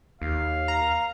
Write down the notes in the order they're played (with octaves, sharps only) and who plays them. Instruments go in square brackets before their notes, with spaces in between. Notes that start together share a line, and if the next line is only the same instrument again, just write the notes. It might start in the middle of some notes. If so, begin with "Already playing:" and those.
[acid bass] D#2 [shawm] F5
[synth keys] A#5